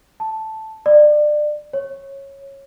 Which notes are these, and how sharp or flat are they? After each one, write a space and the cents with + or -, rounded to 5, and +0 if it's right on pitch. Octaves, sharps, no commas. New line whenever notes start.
A5 +0
D5 +25
C#5 -10